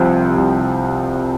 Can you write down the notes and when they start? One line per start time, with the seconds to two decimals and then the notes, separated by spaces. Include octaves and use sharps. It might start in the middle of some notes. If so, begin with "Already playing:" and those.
Already playing: C2 C3 F3 C4
0.38 C2